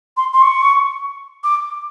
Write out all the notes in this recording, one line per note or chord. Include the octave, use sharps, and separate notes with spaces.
C6
C6
C#6
D6